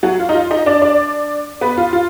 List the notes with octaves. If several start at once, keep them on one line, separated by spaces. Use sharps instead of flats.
F#3 F#4
F4
D#4
F4
D#4 D#5
D4 D5
D4 D5
B3 B4
F4
F4